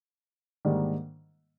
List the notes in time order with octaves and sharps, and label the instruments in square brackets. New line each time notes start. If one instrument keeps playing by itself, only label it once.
[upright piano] G#2 D#3 G3 A#3 D4